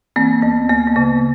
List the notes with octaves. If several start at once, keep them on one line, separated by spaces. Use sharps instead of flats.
E3 A#3 C4
D2 B3
D2 A#3
B3
C#3 A#3